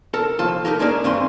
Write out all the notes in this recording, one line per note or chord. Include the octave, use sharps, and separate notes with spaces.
A4 A#4 A5
D#2 F3 F4 A4 A5
D#4 G4 A4 A#4
G#3 A#3 C#4 D4 G#4 A#4
G2 D#3 A3 C4 G#5 C6